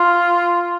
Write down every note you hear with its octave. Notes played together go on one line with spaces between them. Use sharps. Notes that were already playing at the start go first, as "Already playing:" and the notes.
Already playing: F4